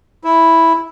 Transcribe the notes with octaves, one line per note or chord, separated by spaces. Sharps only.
E4